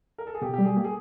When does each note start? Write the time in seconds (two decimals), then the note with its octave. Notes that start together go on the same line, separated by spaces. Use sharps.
0.18 A#4
0.27 A4
0.35 G#4
0.42 B2 G4
0.54 G4
0.59 G3
0.65 G#4
0.76 A#3 G4
0.84 G#4